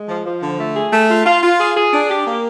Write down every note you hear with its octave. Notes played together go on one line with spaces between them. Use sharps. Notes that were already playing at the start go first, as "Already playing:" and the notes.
Already playing: G#3
F3
F3
D3
A3
G#4
A3
F4
F4
F4
G#4
G#4
D4
G4
A#3